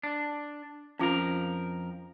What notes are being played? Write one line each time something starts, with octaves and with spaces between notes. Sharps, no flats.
D4
F2 F3 C#4 F4 A#4